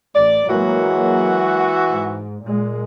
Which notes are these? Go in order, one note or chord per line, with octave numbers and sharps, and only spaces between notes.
A1 D5
E3 F#3 G#3 A#3 F#4
G#2
A#2 G#3